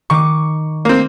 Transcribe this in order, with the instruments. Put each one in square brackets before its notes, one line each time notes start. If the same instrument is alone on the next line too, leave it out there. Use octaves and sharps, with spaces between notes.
[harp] D#3 D6 [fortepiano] C#6
[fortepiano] A#3 C4